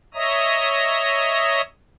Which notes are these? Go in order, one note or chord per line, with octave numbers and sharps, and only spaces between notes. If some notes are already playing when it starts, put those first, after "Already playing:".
C#5 D#5 E5 A#5 D#6